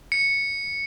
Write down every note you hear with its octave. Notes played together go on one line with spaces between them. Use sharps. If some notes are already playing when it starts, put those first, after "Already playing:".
C#7